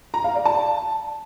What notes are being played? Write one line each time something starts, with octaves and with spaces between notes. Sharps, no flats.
A#5
F5
D5
A5